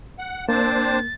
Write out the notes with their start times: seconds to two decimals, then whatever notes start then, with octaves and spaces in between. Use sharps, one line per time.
0.19 F#5
0.49 A#3 C4 D4 C5 A6